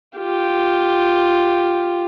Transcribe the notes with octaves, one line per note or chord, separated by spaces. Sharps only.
F4 G4